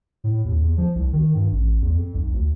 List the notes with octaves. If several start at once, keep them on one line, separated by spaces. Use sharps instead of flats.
A2
D#2
E2
F3
C2
D#3
G2
A1
E2
F2
B1
D2